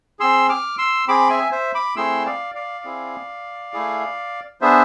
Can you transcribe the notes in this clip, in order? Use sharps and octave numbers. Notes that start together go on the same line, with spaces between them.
C4 G#4 C6 E6
D6 F6
C6 E6
C4 G#4 B5 D6
E5 G#5
C5 E5
B5 D6
A3 C4 E4 G#4 C6 E6
D5 F5
D5 F5
C4 E4 G#4
A3 E4 G#4
B3 D4 G#4 C5 E5